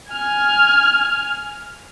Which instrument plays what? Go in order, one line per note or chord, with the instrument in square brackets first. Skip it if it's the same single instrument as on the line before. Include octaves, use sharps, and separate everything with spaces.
[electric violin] G#5 F6